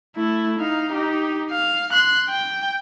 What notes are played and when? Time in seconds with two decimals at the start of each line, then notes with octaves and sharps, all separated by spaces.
0.16 A3 E4
0.59 D#4 F5
0.92 D#4 G4
1.51 F5
1.93 C6 F#6
2.29 G5